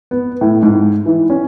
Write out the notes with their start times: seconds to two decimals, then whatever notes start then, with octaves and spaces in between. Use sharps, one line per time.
0.11 B3
0.41 A2
0.63 G#2
1.06 E3
1.30 C#4